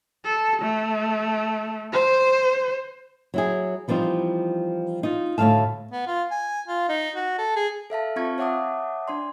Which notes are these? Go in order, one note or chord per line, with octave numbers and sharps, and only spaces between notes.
A4
A3
C5
F#3 E4 G#4
E3 F3 G3 C4 D#4
D#4 F4
D2 A2 E3 A3 F5 A5
B3
F4
G#5
F4
D#4
F#4
A4
G#4
A4 E5 F5 A5
C4 F4 F5 A5 C#6 G#6
C#5 E5 F#5 A5 D6 D#6
D4 D5 C6